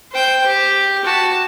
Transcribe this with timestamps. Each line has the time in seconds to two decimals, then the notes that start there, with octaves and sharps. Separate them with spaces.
0.12 C5 G5
0.46 G4
1.04 F#4 A5